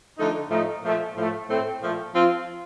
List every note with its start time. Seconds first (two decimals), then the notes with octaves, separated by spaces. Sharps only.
0.18 D3 F3 A3 D#4
0.50 A2 F3 A3 D#4
0.83 A#2 F3 A3
1.16 A2 F3 A3
1.48 A2 A3 C4
1.81 A#2 F3 A3
2.14 F3 C4 F4